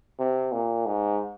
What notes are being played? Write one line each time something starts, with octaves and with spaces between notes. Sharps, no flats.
C3
A#2
G#2